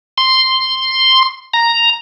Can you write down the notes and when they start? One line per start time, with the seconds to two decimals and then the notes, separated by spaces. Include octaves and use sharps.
0.18 C6
1.54 A#5